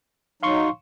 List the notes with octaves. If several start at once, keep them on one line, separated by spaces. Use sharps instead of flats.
F#3 D#4 F5 C6 C#6